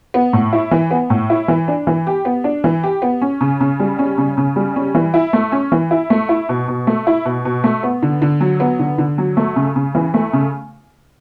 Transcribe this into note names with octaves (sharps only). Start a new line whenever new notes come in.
B3
A2
E4
E3
B3
A2
E4
E3
D4
E3
G4
B3
D4
E3
G4
B3
C#4
C#3
C#3
G3
C#4
C#3
C#3
G3
C#4
E3
E4
A3
C#4
E3
E4
A3
E4
B2
B2
A3
E4
B2
B2
A3
B3
D3
D3
F#3
B3
D3
D3
F#3
A3
C#3
C#3
E3
A3
C#3